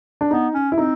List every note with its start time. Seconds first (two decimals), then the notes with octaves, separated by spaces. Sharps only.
0.21 D4
0.31 B3 D#4
0.54 C#4
0.72 E4
0.78 C4 D#4